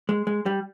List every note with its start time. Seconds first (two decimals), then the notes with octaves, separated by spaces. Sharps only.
0.09 G#3
0.27 G#3
0.46 G3